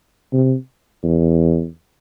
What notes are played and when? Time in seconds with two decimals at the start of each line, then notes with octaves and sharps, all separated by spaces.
0.33 C3
1.03 E2